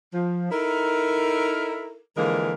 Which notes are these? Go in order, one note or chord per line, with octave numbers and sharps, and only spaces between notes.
F3
D#4 E4 A4 A#4
D3 E3 F3 G#3 A#3 A#4